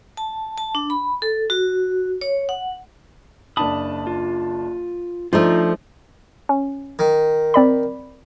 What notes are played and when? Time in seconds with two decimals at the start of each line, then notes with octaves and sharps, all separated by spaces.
0.17 A5
0.58 A5
0.75 D4
0.90 B5
1.22 A4
1.50 F#4
2.21 C#5
2.49 F#5
3.57 F#1 D4 A5 B5 D#6
4.07 F4
5.33 F3 A3 D4 D#4 F4 C5 A#5
6.49 C#4
6.99 D#3
7.54 C4 D5 B5